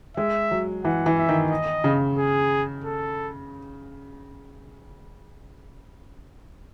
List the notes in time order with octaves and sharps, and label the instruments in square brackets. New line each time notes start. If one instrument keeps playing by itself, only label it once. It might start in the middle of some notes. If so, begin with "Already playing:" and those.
[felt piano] G#3 [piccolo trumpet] E5
[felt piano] F#3
[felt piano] E3 [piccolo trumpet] F#5
[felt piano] E3
[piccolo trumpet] E5
[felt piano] D#3
[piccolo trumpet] D#5
[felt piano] C#3
[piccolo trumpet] G#4
A4